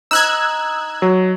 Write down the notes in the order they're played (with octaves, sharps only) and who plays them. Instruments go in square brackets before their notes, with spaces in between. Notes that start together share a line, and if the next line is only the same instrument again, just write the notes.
[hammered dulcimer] D#4 [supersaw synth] E6 F#6 G#6
[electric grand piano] F#3